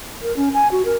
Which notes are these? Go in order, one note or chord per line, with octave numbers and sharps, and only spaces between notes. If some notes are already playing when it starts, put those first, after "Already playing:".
A#4
C#4
G#5
F#4
A#4